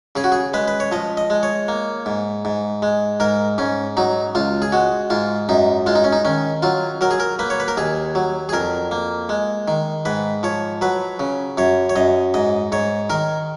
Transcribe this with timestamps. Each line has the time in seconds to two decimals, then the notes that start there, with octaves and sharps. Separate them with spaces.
0.16 C#3 G#4
0.24 F#4
0.32 G#4
0.54 G#3 B4
0.68 B4
0.80 C#5
0.92 F3 D#5
1.17 D#5
1.30 G#3
1.43 C#5
1.68 A#3
2.06 G#2
2.45 G#2
2.82 G#3
3.20 G#2 A#4
3.58 G#2 C#4
3.97 F#3 D#4
4.35 C#2 F4
4.62 G#4
4.72 G#3 F#4
5.10 G#2 F4
5.49 F#2 D#4
5.86 G#3 F4
5.95 D#4
6.04 C#4
6.12 D#4
6.25 D#3 C#4
6.62 F#3 F4
7.01 F#3 A#4
7.11 G#4
7.20 A#4
7.39 A#3 B4
7.50 C#5
7.60 B4
7.68 A#4
7.77 D#2 G#4
8.15 F#3
8.49 G#4
8.53 F2 A#4
8.91 A#3
9.29 G#3
9.68 D#3
10.05 G#2 B4
10.43 F3 C#5
10.81 F#3 B4
11.20 C#3
11.58 F#2 C#5
11.89 C#5
11.96 F#2 D#5
12.34 G#2 D#5
12.72 G#2 C#5
13.10 D#3 A#4